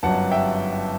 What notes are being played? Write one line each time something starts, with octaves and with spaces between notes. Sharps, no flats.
G1 F#2 F#3 F#5 A5
E5 G5